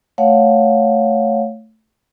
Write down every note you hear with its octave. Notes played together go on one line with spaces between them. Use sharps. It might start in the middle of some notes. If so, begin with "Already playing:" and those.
A3 C#5 F5 F#5